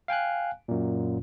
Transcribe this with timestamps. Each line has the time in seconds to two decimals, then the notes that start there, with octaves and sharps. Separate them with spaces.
0.08 F5 G5 G#5 F#6
0.68 F#2 A#2